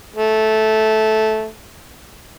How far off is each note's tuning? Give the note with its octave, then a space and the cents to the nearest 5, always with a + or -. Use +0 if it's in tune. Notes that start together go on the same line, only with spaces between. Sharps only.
A3 -10